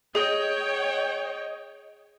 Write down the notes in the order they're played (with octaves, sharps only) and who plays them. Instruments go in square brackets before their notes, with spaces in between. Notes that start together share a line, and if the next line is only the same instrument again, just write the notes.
[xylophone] G#4 [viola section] C#5 G5 [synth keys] D#5